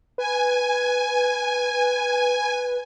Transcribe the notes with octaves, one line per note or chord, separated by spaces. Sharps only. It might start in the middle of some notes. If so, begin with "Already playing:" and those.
B4 G#5